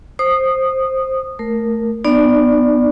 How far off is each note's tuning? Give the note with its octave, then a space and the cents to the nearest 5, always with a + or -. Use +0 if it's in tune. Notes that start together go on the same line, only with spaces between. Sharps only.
C5 +10 D#6 -15
A3 +0 A#4 +0
B3 +0 D#4 -45 D5 +0